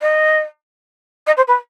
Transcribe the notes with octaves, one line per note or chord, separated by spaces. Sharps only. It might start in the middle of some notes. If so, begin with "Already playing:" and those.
D#5
D#5
C5
B4